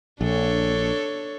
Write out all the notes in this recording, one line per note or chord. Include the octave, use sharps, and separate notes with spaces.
A#1 D4 A4 C#5